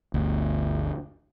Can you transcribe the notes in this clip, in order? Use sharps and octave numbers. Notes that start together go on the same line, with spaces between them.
G1 D2